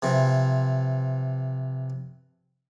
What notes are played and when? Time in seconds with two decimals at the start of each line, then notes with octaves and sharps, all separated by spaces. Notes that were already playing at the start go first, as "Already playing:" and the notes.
0.02 C3 E3 F3